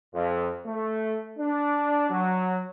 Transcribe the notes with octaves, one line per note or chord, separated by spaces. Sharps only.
F2
A3
D4
F#3